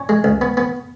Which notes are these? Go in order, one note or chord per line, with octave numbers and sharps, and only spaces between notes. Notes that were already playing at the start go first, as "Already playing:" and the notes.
Already playing: C#4 C#5
G#3
C#2
B3
B3